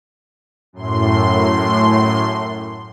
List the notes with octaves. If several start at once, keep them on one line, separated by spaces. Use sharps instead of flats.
F#2 A2 C6